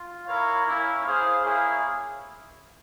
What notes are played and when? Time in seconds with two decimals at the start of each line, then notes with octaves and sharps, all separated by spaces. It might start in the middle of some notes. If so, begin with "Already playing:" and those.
Already playing: F4
0.26 E4 A#4 C#5 F5
0.65 A#3 C#4 E4
1.04 E4 G#4 C5 F5
1.43 A#3 E4 G#4 C#5 F5